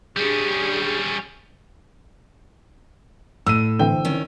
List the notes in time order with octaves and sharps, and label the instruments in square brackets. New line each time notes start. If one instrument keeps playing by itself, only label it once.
[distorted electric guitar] G3 C#4 [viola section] D4 G4 G#4
[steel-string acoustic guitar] A2 [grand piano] E6 D#7
[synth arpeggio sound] D3 E3 C4 [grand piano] G5
[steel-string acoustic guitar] D#3 C#4